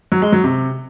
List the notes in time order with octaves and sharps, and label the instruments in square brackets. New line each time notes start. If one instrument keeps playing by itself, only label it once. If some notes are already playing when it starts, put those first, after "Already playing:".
[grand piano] F#3
G#3
F#3
C3